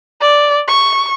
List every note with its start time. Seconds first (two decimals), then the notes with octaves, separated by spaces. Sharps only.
0.21 D5
0.68 C#6